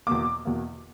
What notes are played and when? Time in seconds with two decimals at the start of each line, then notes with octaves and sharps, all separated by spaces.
0.07 E2 B2 A#3 D6
0.45 E2 B2 A#3